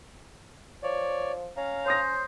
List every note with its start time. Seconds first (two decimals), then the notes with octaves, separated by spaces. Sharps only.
0.83 F3 C#5 D5
1.57 C#4 F5 A#5
1.86 C5 C#5 D#6 A#6